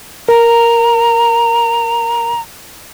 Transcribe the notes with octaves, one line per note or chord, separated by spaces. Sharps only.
A#4 A#5